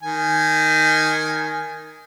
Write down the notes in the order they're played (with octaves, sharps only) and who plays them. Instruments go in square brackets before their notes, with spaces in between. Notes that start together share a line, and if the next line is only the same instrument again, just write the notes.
[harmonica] D#3 G#5